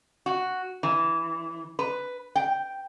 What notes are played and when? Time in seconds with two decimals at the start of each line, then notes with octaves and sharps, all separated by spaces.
0.26 F#4
0.83 E3
1.79 B4
2.35 G5